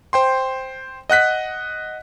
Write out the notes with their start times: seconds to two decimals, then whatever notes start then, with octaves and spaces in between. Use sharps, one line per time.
0.13 C5 G5 C6
1.10 D#5 F#5 F#6 B6